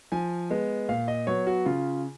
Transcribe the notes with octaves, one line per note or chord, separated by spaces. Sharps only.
F3 G#5
G#3 B3
A#2 F5
D#5
F#3 B3 C#5
F#4
C#3 F4